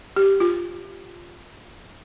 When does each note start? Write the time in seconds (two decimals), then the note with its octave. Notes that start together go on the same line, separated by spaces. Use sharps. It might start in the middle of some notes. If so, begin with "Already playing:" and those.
0.16 G4
0.40 F4